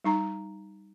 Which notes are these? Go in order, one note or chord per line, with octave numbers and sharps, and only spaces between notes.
G3 D#4 A#5